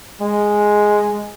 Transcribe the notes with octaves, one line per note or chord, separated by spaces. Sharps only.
G#3